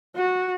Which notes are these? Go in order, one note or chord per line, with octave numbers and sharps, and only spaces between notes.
F#4